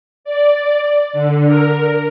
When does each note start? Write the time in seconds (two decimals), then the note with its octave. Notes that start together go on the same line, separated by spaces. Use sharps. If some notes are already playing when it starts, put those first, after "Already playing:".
0.25 D5
1.13 D3
1.46 A#4